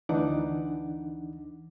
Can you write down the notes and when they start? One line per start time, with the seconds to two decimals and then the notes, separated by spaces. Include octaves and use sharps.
0.09 D2 E3 D4 D#4 F#5 D6